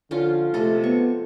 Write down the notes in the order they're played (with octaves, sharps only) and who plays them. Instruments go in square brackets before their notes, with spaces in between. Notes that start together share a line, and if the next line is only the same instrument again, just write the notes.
[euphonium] D3 [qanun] F3 C#4 F4
[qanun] C3 G#3 A4 [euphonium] A3
[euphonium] B3 [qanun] C#6